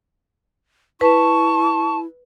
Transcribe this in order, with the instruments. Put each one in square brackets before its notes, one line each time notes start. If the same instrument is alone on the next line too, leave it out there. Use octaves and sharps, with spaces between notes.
[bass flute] E4 [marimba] B4 [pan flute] A5 [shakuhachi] C#6